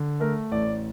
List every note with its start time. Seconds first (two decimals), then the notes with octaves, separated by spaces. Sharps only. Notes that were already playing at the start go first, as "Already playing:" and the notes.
Already playing: D3
0.20 A3 A#4
0.51 A1 D5